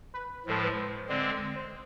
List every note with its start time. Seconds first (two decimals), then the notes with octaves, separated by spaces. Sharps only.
0.14 B4
0.46 A2 F3 G#3 A4
0.63 B4
0.77 C5
1.09 D3 G#3 C4 D5
1.56 C5